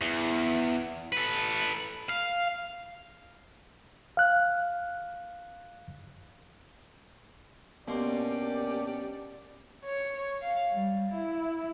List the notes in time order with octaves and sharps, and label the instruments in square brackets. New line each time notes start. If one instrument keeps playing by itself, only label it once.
[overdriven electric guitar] E2
A4 B4
F5
[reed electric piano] F5 F#6
[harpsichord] B2 C6 [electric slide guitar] A#3 [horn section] C#4 D4 D5 [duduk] G4
[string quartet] C#5
F5
G3
E4